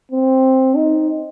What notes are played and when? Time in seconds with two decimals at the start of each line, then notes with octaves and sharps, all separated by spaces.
0.12 C4
0.76 D#4